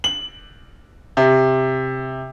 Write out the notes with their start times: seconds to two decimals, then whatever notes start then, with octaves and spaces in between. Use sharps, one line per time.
0.04 F#7
1.17 C3